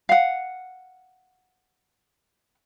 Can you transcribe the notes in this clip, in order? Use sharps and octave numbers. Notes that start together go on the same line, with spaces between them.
F5 F#5